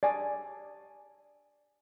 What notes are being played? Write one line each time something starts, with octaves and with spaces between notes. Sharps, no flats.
D5 G#5